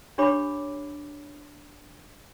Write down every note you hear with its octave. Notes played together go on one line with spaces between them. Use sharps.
D4 G4 C#5 B5 D6